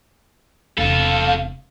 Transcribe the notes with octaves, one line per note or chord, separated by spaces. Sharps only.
E1 C3 F4 A4 F5